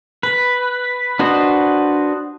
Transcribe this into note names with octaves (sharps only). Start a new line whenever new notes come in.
B4
D4 F#4 B4 C5 D#5